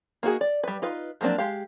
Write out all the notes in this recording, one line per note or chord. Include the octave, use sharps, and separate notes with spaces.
A#3 D#4 F#4 G#4
D5
G3 B4
D#4 F4 B4
F3 F#3 A#3 C4 D4
G#3 G4 F5